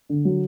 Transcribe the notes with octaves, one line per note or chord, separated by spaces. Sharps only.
D3
F#3